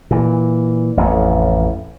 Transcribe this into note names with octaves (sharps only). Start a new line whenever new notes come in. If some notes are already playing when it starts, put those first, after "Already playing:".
A#2 E3
A1 F2 A2